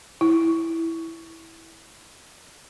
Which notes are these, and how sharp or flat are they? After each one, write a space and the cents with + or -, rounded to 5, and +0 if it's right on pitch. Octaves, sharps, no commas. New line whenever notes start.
E4 -5